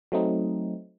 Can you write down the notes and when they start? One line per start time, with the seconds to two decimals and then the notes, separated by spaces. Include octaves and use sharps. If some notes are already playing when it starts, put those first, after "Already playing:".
0.12 F#3 A3 C4 D#4